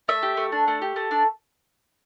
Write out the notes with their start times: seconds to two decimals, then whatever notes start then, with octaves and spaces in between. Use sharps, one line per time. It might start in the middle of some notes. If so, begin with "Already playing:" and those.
0.08 A3 E5
0.23 G4
0.37 A3
0.52 D4
0.68 A3
0.82 G4
0.96 A3
1.11 D4